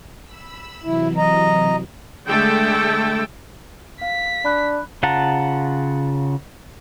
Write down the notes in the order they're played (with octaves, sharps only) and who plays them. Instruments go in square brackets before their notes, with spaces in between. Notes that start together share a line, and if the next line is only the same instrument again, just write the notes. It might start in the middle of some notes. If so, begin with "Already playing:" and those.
[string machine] B5 E6
[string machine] C3 E3 F#3 [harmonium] E4
[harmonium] D#5 A#5
[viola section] D3 G#3 A3 A4 G5
[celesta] F5 [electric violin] B6
[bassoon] D4 [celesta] B5 F#6
[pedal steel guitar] C#3 F4 F#5 A5 A#5